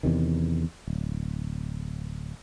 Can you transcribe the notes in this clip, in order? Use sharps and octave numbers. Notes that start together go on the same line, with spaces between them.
E2 C3 D#3
D1